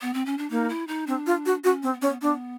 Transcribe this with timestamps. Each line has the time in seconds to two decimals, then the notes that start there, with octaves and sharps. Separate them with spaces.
0.01 B3
0.14 C4
0.26 C#4
0.38 D4
0.50 A#3 D#4
0.69 E4
0.88 D#4
1.07 C4 D4
1.26 F4
1.46 F#4
1.64 C#4 F#4
1.83 C4
1.93 B3
2.00 C4 C#4
2.09 B3
2.22 B3 D4